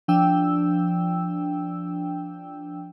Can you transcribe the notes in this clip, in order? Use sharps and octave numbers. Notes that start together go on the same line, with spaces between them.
F3 D4 G5 E6